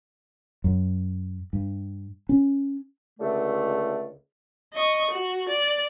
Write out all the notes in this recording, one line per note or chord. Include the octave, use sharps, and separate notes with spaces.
F#2
G2
C#4
C#2 D3 A3
D#5 C#6
F#4
D5